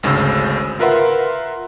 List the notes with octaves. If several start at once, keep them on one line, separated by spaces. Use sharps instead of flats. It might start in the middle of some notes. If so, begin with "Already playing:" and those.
G#1 D2 C#3 C#4 C5 E6
F4 A#4 B4 E5 F#5 C6